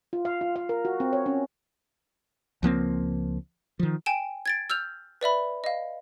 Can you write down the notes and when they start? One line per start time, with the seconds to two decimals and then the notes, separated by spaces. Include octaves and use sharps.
0.13 F4
0.25 F5
0.41 F4
0.56 F5
0.69 A#4
0.85 F#4
1.00 C4
1.13 C#5
1.26 C#4
2.63 C#2 F3 A#3 C4
3.79 D#3 F3
4.06 G5 G#5 D7 E7
4.46 G#6 A6 D7
4.70 E6 F6 G6 F7
5.21 B4 D5 E5 B5
5.64 D#5 F5